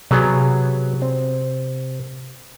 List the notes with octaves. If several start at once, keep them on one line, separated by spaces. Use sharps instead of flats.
C3 F#3 B3 G#4
C4